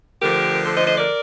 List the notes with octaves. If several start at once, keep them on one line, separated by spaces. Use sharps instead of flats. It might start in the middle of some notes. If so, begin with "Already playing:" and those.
D3 F3 A3 G4 A#4
A4 C5
C5 D#5
C5 D#5
A#4 D5